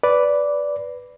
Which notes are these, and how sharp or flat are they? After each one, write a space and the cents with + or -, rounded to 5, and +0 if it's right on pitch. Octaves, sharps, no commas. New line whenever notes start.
B4 +0 D5 -10